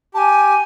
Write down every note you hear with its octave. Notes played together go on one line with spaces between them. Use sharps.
G4 G#5 A5